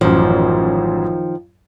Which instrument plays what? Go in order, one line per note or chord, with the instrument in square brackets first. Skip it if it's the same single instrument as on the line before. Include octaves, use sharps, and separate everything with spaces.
[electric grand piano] A1 F#2 [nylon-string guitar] D#3 F3